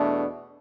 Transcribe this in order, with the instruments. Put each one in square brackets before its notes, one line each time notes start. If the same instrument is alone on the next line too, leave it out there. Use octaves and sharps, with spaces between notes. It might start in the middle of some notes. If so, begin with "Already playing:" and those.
Already playing: [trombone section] E2 B2 A3 D4